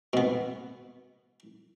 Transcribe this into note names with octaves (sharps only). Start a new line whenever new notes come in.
B2 B3